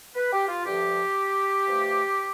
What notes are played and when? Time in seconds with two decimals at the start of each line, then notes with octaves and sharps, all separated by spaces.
0.15 B4
0.32 G4
0.48 F4
0.65 G2 D3 F3 A3 G4
1.66 G2 F3 A3